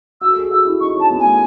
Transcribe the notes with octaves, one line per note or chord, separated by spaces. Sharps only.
F#4 E6
A4
G#4
F#4 E6
E4
D#4 C#6
C#4
A5
B3
G#5
A3